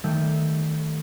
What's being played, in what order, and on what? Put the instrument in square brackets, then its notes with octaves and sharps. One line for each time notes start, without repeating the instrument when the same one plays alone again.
[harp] D#3 G3 A3 E6 G6